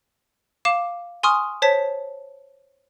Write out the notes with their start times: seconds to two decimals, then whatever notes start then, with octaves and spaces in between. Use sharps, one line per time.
0.65 F5 D6 E7
1.23 G#5 C6 C#6 D#6 F6
1.62 C5 C#5 A5 B6